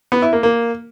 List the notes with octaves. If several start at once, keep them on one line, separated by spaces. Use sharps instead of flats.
B3
E4
A#3
A#3